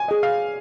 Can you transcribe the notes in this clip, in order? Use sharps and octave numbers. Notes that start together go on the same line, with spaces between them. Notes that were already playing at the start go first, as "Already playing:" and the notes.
Already playing: G#5
G#4 D#5
F5